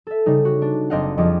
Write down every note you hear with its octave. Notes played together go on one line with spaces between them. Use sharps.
A4 E5
C#3 G3 D#4
F#4
D4
F#1 C4 D4 D#5 F5 F#5
F2 F3 G3 G#4 D#5 D6